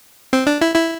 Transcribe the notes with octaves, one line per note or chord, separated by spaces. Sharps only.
C4
D4
E4
E4